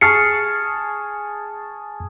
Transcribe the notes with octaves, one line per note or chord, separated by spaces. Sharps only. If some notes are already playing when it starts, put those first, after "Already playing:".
G#4 A5 C#6 F6 C7 C#7